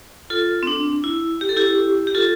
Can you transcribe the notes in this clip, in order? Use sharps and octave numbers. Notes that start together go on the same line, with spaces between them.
F4 A4
C4
D4
E4
G4
A4
E4 G4
G4
F4 A4